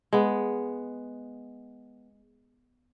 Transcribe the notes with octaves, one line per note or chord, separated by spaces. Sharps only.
G#3 B3